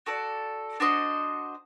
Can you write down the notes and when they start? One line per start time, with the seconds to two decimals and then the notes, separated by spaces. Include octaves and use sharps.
0.06 F#4 A4 D5
0.80 D4 F#4 C5 D#5